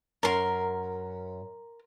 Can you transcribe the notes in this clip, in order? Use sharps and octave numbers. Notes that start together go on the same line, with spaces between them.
F#2 A#4 C6